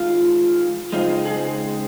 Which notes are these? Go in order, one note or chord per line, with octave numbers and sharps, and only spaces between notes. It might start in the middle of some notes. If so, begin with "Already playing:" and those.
Already playing: D#3 G#3 F4
C#3 G#3 C4 D#4 F4
G#4